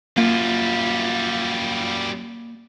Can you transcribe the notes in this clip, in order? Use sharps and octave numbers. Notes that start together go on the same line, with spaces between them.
F#2 G3 A#3 F4